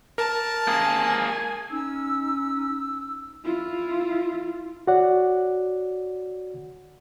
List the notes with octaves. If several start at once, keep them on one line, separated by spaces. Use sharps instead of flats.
A#4 A5
A#3 G#4 G#5
C#4 D#4 E6
E4 F4
F#4 C#5 D5 F#5